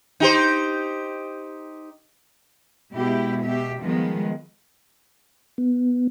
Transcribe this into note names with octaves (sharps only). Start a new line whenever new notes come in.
D#4 G4 C5
B2 G#3 E4 G4
B2 G4 E5
D#3 F3 G3 G#3 B3
B3